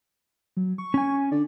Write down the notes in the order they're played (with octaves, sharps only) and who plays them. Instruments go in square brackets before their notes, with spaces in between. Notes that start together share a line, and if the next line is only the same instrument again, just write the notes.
[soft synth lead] F#3
C#6
[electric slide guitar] C#4 G#5
[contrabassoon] D3 [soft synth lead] D5